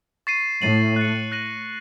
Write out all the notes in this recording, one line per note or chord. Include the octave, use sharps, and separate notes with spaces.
C#6 A6 C7 D#7
A2 A6 C7 D#7 F#7
F#6 A6 C#7
F#6 A#6 D#7 F#7